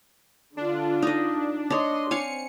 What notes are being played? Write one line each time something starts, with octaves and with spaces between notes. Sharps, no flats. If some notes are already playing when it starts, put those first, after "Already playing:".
D3 D4 F4
D#4 D#5
D4 C#5 D#5 C6
C4 C#5 F5 G#5 C#7